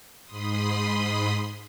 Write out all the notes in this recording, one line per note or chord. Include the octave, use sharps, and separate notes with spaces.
G#2 B5 C6 D#6